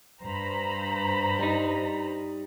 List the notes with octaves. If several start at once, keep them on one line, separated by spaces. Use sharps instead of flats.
G2 C5 A#5 B5
G3 D#4